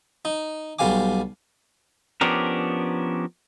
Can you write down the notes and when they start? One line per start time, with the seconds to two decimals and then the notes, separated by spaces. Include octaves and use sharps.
0.25 D#4
0.79 B1 G3 F5 G#5 D6
2.21 F3 B3 C#4 D4 G4 A#4